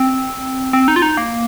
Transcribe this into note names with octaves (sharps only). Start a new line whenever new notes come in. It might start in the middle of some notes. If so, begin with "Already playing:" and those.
Already playing: C4
C4
D#4
F4
D#4
A#3